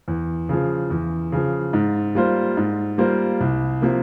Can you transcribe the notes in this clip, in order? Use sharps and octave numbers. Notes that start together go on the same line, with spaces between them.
E2
C#3 F3
E2
C#3 F3
G#2
G3 A#3 F4 C5
G#2
G3 A#3 F4 C5
C2
C3 F3 A#3